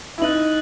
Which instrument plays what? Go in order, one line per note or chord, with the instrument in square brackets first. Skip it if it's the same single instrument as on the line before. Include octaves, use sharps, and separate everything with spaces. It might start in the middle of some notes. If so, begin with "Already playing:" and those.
[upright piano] E4
[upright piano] D#4 [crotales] F#6 A6 D#7 F#7